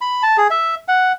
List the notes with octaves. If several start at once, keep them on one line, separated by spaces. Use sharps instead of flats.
B5
A5
G#4
E5
F#5